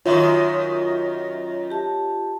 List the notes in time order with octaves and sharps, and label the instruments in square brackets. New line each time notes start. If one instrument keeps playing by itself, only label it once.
[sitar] F#2 D#3 F#4 [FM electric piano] F4 [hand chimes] C#5 E5
[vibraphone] G4 A5